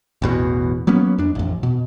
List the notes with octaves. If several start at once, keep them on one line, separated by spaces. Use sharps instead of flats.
A1 E2 B2
F#3 A#3 B3 C#4
F2 D4
A1 F2
B2